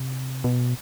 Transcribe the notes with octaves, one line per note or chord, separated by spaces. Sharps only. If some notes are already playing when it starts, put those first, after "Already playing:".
Already playing: C3
B2